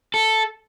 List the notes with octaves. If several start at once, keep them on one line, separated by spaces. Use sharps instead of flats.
A4